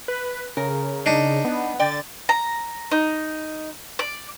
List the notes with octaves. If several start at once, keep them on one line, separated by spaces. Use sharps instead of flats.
B4
C#3 A#4
D4 D#4
B3
D3 D5 G5 A6
A#5
D#4
D5